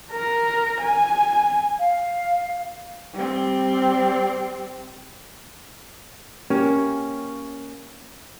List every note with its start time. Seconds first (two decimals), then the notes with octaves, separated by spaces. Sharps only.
0.12 A#4
0.81 G#5
1.80 F5
3.14 G3 C4
6.50 A#3 C#4 G4